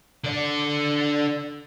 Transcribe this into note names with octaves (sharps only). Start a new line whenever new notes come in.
D3 D5